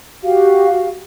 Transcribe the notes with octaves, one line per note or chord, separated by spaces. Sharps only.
F#4 G4 F5